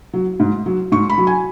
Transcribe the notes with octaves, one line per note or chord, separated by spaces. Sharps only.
F#3
G#2
F#3
G#2 C#6
B5
F#3
G#5